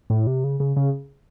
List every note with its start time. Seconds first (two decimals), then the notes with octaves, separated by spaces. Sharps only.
0.10 A2
0.27 C3
0.44 C#3
0.60 C#3
0.76 C#3